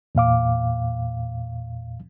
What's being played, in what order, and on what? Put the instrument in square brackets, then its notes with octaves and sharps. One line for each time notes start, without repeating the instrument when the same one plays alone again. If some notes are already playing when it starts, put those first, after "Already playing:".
[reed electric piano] E2 A#2 F5 D6